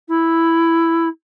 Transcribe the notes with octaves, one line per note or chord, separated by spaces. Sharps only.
E4